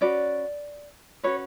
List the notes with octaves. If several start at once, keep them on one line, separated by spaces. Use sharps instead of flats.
C#4 F#4 B4 D5
C#4 F#4 B4 C#5